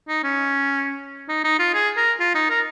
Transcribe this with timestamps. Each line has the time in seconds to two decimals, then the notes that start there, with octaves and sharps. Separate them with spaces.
0.08 D#4
0.23 C#4
1.29 D#4
1.44 D#4
1.59 F4
1.74 G#4
1.97 A#4
2.20 F4
2.35 D#4
2.50 A#4